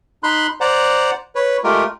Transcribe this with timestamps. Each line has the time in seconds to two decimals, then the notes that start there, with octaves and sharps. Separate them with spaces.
0.23 D#4 B5 C6 F#6
0.60 C5 D5 F#5 A#5
1.35 B4 C#5
1.64 G#3 A3 F4 G4 A#4